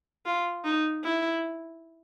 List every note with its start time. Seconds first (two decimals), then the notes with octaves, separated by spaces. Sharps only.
0.26 F4
0.64 D#4
1.04 E4